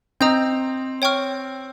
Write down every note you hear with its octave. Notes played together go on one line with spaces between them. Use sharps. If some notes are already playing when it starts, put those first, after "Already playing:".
C4 D#5 A#5 D#6 G6
C#5 G5 C#6 F6